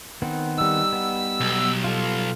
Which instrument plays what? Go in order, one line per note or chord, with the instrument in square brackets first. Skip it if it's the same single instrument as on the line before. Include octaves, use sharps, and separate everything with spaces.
[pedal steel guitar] D#3 B3 C4
[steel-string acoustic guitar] G3 D#4 [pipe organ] E6
[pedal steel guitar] B3
[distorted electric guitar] B1
[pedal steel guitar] F4 A4